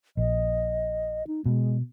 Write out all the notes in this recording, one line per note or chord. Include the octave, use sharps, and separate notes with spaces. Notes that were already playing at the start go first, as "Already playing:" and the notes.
A#1 D#5
D#4
B2 G#3